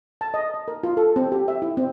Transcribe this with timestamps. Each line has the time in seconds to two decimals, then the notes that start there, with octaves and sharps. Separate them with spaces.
0.21 A5
0.34 D#5
0.54 D#5
0.68 A#4
0.83 F4
0.97 A4
1.16 C4
1.32 G4
1.48 E5
1.62 E4
1.77 C4